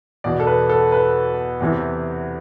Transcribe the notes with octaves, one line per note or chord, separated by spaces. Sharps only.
E2 B2 D5
A4
B4
A4
B4
E2 C3 E3